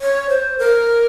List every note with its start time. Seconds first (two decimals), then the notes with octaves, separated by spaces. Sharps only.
0.01 C#5
0.29 C5
0.59 A#4